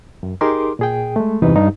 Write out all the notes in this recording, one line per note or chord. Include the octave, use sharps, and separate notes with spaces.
F#2
D#4 G4 G#4 A#4 C6 D6
A#2 G#4 G5
G#3 A3
E2 G2 C3 E3 D#4 B4
G2 D#4